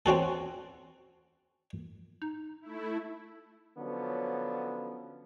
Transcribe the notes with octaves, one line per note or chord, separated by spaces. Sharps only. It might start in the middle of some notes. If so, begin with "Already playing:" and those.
C4 C#4 F#4 A4
D#4
A3 E4
D3 F3 F#3 B3 C#4